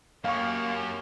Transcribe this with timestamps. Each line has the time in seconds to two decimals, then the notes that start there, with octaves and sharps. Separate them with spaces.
0.24 F#2 A#3 G4 C#5 F5 C#6